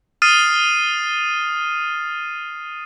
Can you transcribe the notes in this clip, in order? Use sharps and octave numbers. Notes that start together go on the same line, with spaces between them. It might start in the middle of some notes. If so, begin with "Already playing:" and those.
D#6 F6 A6 C7 D#7